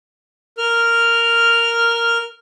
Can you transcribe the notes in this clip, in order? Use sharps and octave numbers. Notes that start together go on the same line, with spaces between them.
A#4 F6